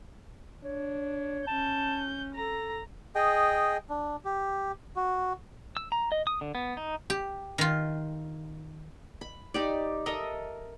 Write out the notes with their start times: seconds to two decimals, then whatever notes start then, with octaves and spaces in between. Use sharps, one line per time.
0.63 D4 C#5
1.47 C#4 A5 G6
2.35 A4 A#5
3.15 G#4 D#5 G5
3.89 D4
4.25 G4
4.96 F#4
5.77 E6
5.92 A#5
6.12 D#5
6.27 D#6
6.41 D3
6.55 B3
6.77 D#4
7.10 G4
7.58 D#3 F4
9.21 B5
9.54 D#4 G4 D5
10.06 A4 A#4 D#5 E5